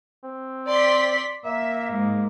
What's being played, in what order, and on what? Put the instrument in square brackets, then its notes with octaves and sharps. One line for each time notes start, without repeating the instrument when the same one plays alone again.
[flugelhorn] C4
[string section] D5 C6 B6
[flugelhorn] A#3 [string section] E5
[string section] G#2